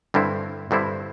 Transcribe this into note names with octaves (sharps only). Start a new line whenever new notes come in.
G2 D3 G3 C4 E4
G2 D3 G3 C4 E4